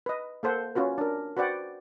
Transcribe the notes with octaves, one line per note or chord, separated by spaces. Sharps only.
B4 D#5
A#3 A4 C5 F#5
C#4 F4 F#4 B4
D4 A#4
F#4 B4 C5 D5 F#5 G5